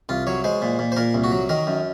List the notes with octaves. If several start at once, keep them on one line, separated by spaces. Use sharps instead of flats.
C2 F4
F#3 C#5
G#3 C5
A#2
A#2
C5
A#2 A#4
C2
F#4
F#3
D#3 A#4
F#2